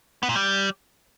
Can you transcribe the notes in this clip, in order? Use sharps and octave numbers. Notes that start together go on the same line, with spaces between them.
B3
A#2
G3